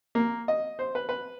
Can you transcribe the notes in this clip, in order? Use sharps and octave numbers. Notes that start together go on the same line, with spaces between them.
A#3
D#5
C5
B4
B4